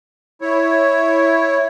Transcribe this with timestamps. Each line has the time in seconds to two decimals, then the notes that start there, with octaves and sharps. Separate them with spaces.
0.41 E4 C#5